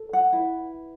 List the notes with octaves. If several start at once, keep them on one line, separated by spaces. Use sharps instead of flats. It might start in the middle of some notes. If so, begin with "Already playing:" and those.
Already playing: A4
F#5
E4 B4